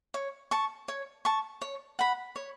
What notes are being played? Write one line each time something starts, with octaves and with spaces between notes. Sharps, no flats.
C#5
A5 C#6
C#5
A5 C#6
C#5
F#5 B5
C#5